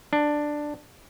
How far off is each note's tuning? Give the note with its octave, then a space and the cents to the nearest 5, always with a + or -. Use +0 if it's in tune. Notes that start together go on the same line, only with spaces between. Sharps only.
D4 +10